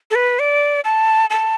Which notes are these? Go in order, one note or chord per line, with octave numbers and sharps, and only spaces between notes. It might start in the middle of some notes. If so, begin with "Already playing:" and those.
A4
B4
D5
A5
A5